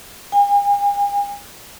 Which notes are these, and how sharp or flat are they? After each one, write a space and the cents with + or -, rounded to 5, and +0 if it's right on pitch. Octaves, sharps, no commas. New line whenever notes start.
G#5 -45